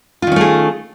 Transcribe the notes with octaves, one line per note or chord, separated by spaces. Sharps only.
D#3 A3 C#4 F4 G#4